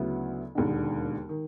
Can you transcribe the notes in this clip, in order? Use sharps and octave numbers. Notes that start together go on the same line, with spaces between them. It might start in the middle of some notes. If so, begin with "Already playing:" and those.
Already playing: D2 C#3 F#3 B3 E4
E1 D#2 D3
D#3